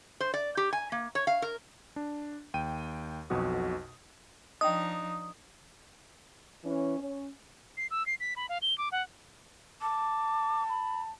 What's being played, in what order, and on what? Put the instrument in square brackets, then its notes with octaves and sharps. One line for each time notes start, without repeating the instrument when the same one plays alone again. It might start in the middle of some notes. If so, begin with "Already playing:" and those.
[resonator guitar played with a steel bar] C5
D5
G4
G#5
A#3
C#5
F5
A#4
[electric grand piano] D4
D#2 G5 G6 D#7
B1 F2 B2 F#4 D#6
[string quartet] F3 D4 D#4 [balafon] D#5 G5 [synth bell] D#6
[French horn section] E3 C#4
C#4
[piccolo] C7
E6
C7
B6
B5
F5
G7
D6
F#5
[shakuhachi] A5 [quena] D6
[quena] B5